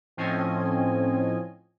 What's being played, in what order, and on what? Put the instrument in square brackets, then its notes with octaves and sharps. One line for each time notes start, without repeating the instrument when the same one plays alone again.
[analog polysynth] A2 F3 C4 C#4 D#5 G#5